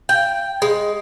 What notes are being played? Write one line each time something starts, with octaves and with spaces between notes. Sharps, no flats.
G5
G#3